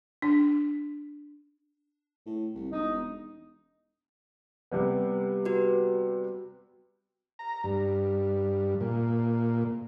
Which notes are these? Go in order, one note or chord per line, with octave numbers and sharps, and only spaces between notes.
D4
A2
C2
E1 D#4
C3 G3 B3
F#4 B4
A#5
G2
A#2